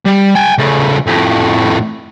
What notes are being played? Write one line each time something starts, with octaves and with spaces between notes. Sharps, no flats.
G3
G5 G#5
C#3 A3
F2 A2